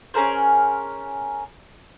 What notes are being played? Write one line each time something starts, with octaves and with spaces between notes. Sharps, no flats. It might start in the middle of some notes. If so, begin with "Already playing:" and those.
C#4 G#4 A#4 C5